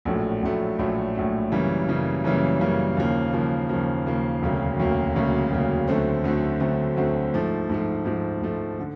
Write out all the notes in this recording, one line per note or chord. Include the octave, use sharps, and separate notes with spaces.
A#1 A2 F#3 A3
A#1 A2 F#3 A3
A#1 A2 F#3 A3
A#1 A2 F#3 A3
F#2 C#3 E3 G3 A#3
F#2 C#3 E3 G3 A#3
F#2 C#3 E3 G3 A#3
F#2 C#3 E3 G3 A#3
D#2 C#3 F3 A#3
D#2 C#3 F3 A#3
D#2 C#3 F3 A#3
D#2 C#3 F3 A#3
E1 D2 C#3 F#3 A#3
E1 D2 C#3 F#3 A#3
E1 D2 C#3 F#3 A#3
E1 D2 C#3 F#3 A#3
D2 D3 F#3 A3 C4
D2 D3 F#3 A3 C4
D2 D3 F#3 A3 C4
D2 D3 F#3 A3 C4
G#2 F3 A3
G#2 F3 A3
G#2 F3 A3
G#2 F3 A3
D3